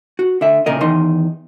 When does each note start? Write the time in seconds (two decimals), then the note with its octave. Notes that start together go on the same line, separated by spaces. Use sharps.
0.19 F#4
0.41 D3 E5
0.66 A#2 C#3 A#4 D#5
0.81 E2 D#3 D#4 C6